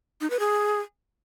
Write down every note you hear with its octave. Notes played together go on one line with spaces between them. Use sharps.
D#4
B4
G#4